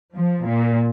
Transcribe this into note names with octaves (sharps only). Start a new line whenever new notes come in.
F3
A#2